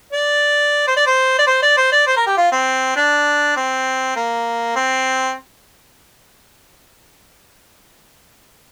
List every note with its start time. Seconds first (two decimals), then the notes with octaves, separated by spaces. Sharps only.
0.13 D5
0.88 C5
0.97 D5
1.07 C5
1.39 D5
1.47 C5
1.62 D5
1.77 C5
1.92 D5
2.07 C5
2.17 A#4
2.27 G4
2.38 F4
2.52 C4
2.96 D4
3.57 C4
4.16 A#3
4.76 C4